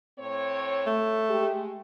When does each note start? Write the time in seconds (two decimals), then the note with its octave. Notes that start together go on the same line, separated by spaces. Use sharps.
0.19 A2 C4 C#5
0.87 A3
1.30 G#3 G4